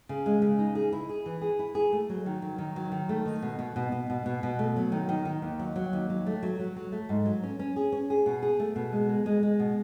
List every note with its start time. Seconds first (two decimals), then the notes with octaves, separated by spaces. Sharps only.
0.09 C#3
0.26 G#3
0.42 C#3
0.59 D#4
0.75 G#4
0.93 E4
1.09 G#4
1.26 E3
1.42 G#4
1.59 E4
1.75 G#4
1.92 A3
2.09 F#3
2.26 D#3
2.42 F#3
2.58 D#3
2.76 F#3
2.92 D#3
3.09 A3
3.25 D#3
3.42 B2
3.59 B2
3.76 B2
3.92 B2
4.10 B2
4.26 B2
4.43 B2
4.59 A3
4.76 F#3
4.92 D#3
5.09 D#3
5.25 D#3
5.42 D#2
5.59 F#3
5.76 F#3
5.93 D#2
6.10 F#3
6.27 A3
6.43 F#3
6.59 F#3
6.76 F#3
6.92 A3
7.09 G#2
7.26 F#3
7.43 C#4
7.59 C#4
7.76 G#4
7.92 C#4
8.10 G#4
8.26 B2
8.43 G#4
8.60 A3
8.76 B2
8.92 G#3
9.09 G#3
9.26 G#3
9.43 G#3
9.59 B2